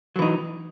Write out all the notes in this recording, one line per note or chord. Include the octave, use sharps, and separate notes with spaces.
E3 F#3 D#4